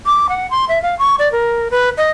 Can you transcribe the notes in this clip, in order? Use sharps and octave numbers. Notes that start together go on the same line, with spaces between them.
D6
F#5
C6
E5
F5
C#6
D5
A#4
B4
D#5